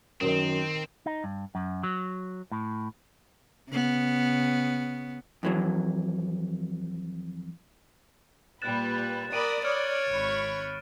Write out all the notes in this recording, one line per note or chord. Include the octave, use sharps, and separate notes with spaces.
F#2 D#3 C4 A#4
D#4
G2
F#2
F#3
A2
C#3 B3
F2 E3 F#3
A#2 G3 B4 F#6 A6 E7
A#4 D5 B5 D#6 D7 D#7
C#5 D5 F6
G#1 B5 C#6